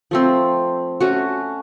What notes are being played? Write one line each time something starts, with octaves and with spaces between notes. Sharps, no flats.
F3 A3 C4
A3 C#4 F#4